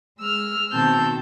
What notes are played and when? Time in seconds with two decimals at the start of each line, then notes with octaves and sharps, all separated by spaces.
0.18 G#3 E6 F6
0.71 B2 D#3 C4 A5 E6 G6